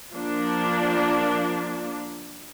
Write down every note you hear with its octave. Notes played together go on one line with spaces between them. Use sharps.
F3 A#3 D4